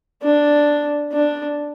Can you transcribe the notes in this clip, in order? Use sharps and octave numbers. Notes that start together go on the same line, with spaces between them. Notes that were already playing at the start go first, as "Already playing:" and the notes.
D4
D4